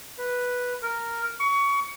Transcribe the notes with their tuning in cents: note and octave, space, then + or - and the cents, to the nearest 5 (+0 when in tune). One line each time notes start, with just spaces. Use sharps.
B4 -5
A#4 -5
C#6 +25